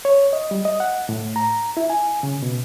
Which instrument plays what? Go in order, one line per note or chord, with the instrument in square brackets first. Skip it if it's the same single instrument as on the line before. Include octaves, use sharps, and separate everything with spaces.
[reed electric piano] C#5
D#5
G3
D#5
F#5
A2
A#5
E4
G#5
C#3
B2